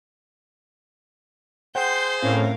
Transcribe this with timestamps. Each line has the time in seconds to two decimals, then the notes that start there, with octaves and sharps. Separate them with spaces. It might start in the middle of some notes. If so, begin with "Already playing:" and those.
1.75 G#4 C5 F#5 G5 C6 G6
2.22 A2 C4 C#4 A#4 C#5 F5